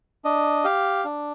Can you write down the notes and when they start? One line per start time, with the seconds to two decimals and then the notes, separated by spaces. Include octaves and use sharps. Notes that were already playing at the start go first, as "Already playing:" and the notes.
0.25 D4 D#5
0.64 G4 F5
1.05 D4